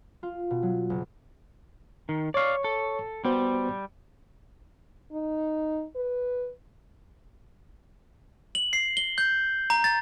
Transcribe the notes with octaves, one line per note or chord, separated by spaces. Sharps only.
F4
B2
F#3
F#1
D#3
C#5 D5 F5 C#6
A4
G3 B3 F#4 C5
D#4
B4
F#7
C7
G7
G6
A#5
A6